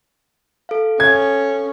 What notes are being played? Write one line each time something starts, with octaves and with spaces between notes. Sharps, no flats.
A4 F5
C#4 G#6